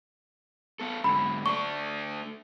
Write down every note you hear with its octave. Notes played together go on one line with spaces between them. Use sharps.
B3 A4
G#2 D3 B5
A3 D4 C#6